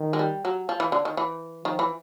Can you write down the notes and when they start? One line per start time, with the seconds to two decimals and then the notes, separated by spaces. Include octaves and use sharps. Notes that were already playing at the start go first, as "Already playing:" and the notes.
Already playing: D#3
0.13 G#3
0.19 G3
0.45 F#3
0.69 F3
0.80 E3
0.92 D3
1.05 D#3
1.17 E3
1.65 D#3 F3
1.79 E3